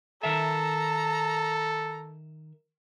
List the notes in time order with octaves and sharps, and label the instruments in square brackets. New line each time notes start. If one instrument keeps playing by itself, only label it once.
[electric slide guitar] D#3 A#4 E5 [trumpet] A4 [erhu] A#5